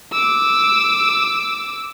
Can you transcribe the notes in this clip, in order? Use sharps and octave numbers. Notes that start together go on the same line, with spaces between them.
D6 E6